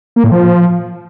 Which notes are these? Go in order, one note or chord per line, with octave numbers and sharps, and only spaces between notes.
A#3
A2
F3